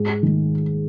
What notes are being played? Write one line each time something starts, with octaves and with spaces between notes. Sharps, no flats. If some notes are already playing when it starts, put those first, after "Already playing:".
Already playing: G#2 G#4
D#3 G#3